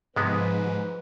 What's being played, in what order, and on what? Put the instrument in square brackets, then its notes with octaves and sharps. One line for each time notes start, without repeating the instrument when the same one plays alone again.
[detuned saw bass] G#2 [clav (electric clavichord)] C3 G#3 B3 [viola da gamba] F3 [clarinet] B4